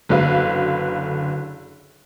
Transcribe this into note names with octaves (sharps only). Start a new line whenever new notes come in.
F#1 D3 F#4 B4 F5